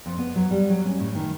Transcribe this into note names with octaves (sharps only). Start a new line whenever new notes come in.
F2
B3
F#3
G3
F#3
C#4
A2
D#3